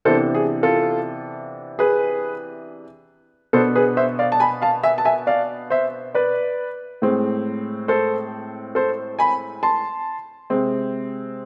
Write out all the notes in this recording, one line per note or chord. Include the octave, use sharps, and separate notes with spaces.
C3 E3 B3 D4 A4 C5
G#4
F4 A4
G#4 B4
B2 B3 D4 A4 C5
G#4 B4
C5 E5
D5 F5
A5
G#5 B5
F5 A5
E5 G#5
A5
E5 G#5
D5 F5
C5 E5
B4 D5
A2 G#3 C4
A4 C5
A4 C5
G#5 B5
A5 C6
C3 G#3 C4